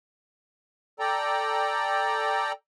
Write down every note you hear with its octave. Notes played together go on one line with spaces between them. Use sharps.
A4 D5 G5 A#5